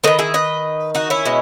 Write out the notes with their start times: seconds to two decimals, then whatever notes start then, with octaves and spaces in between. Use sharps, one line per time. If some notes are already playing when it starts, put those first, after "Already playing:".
0.04 D#3 A3 B4 D#5
0.19 E4 G#4
0.34 B4 D#5
0.95 D#4 F#4
1.10 C#4 E4
1.25 B2 G#3